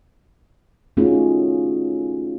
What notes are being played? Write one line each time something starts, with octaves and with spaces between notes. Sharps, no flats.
A3 C#4 D#4 F4 F#4 G#4